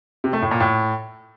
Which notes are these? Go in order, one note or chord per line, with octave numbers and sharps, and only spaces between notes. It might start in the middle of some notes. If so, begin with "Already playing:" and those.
C3
A3
A2
A#2
A2